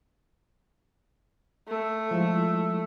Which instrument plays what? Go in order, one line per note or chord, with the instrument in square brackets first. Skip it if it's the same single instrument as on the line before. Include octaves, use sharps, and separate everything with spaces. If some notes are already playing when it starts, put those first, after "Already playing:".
[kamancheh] A3
[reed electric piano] F3 G#3 E4